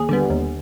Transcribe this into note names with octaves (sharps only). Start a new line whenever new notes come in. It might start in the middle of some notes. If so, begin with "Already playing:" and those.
Already playing: D#2 G#4
D3 G3 B3
D#2